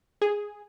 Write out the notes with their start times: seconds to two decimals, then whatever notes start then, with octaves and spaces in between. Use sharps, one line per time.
0.21 G#4